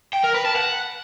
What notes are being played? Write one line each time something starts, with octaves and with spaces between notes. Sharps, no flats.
G5
A#4
B4
A5
F#5